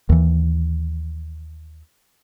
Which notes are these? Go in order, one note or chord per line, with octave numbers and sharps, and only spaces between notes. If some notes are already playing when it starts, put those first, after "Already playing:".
D#2 E3